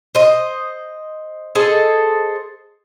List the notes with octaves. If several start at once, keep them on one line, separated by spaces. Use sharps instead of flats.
C5 D#5
G#4 A4 C5 D#5